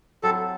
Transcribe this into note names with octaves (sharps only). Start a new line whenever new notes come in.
F#3 C4 E4 A4